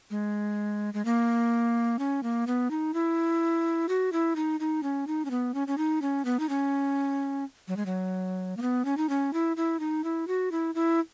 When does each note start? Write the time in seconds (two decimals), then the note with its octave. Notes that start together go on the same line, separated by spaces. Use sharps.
0.11 G#3
0.94 G#3
1.05 A#3
1.99 C#4
2.23 A#3
2.47 B3
2.71 D#4
2.94 E4
3.89 F#4
4.12 E4
4.36 D#4
4.60 D#4
4.83 C#4
5.07 D#4
5.25 C#4
5.31 B3
5.54 C#4
5.68 C#4
5.78 D#4
6.02 C#4
6.25 B3
6.40 D#4
6.49 C#4
7.68 F#3
7.77 G#3
7.86 F#3
8.57 A#3
8.62 B3
8.85 C#4
8.97 D#4
9.09 C#4
9.33 E4
9.57 E4
9.80 D#4
10.04 E4
10.27 F#4
10.52 E4
10.75 E4